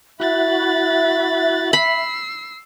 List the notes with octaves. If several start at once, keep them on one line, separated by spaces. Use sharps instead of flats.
E4 F#4 E5 B5 F#6 A6
B5 E6 C7